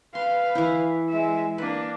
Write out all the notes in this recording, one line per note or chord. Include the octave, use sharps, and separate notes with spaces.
B4 F5 C6
E3 E4
G#3 E5
A#3 D4 B4